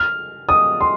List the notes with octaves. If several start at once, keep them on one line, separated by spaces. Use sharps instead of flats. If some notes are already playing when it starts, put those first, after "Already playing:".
Already playing: F6
D#6
C6